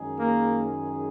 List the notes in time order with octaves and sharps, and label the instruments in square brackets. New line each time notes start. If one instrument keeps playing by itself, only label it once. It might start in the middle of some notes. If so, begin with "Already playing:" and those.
Already playing: [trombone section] F#2 D#3 G#3 D#4 G#4
[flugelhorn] A#3